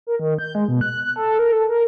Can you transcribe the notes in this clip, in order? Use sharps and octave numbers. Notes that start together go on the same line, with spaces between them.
A#4
D#3
G6
G#3
B2
F#6
A4
A#4
A4
A#4